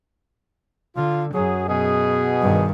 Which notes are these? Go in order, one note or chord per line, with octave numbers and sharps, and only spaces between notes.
D3 F4
F#2 F#3 G#4
B2 G#4
G2 D#3